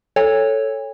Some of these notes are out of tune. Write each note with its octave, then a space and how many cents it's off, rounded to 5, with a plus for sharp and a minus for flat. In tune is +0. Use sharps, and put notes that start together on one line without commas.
A4 +0 C#5 +0 G#5 -45